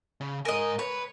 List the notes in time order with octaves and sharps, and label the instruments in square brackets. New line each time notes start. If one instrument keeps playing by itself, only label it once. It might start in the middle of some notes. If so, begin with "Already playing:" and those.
[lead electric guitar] C#3
[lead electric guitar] G#2 G#5 [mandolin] A#4 D#5
[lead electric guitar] B4 [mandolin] C#5